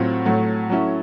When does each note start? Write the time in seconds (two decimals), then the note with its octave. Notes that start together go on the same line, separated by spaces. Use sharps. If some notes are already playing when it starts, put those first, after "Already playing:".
Already playing: A2 F#3 A3 C4 F4
0.26 A2 F#3 A3
0.69 F#3 A3 C#4 E4